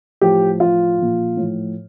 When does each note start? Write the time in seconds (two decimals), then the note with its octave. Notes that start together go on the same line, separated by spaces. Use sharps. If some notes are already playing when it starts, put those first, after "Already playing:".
0.21 A2 F3 G4
0.60 A2 F3 F4
0.98 A#2 F3
1.37 A2 F3